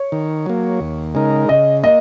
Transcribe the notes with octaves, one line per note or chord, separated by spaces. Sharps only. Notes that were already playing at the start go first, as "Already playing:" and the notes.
Already playing: C#5
D#3
F#3 A#3
D#2
C#3 G#3 D#4 A#4
C#3 D#5
A#3 D#5